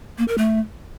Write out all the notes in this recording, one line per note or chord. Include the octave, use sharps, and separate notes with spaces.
A#3
A#4
A3